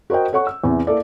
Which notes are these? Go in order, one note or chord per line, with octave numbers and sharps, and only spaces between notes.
F#4 A#4 C5 D#5 G5
A4 C#5 F#5 C#6
E6
E2 C3 E3
A#3 E4 A4 D5